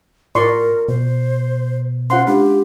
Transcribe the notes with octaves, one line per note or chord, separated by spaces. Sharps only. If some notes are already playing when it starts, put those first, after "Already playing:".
A2 F4 A#4 D5 C6 C#6
B2 C5
C#4 F4 C5 F#5 C6
G#3 D4 G4